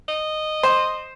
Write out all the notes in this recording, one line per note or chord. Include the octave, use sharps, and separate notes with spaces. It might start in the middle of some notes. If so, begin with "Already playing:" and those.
D#5
C5